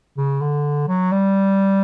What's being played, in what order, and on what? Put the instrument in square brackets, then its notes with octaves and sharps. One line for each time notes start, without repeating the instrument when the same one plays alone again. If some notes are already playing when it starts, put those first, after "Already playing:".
[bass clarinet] C#3
D3
F#3
G3